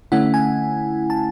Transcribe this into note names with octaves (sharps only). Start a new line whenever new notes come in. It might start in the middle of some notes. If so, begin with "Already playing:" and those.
D3 A3 C#4 E4 F#5
G#5
A5